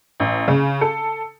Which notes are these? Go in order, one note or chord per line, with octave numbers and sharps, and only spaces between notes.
A1
C#3
A4